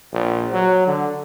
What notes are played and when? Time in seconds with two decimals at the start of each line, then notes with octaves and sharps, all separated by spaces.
0.13 A#1
0.52 F#3
0.87 D3